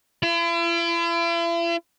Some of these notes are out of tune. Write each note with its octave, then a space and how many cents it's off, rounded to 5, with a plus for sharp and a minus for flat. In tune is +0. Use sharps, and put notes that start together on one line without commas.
E4 +45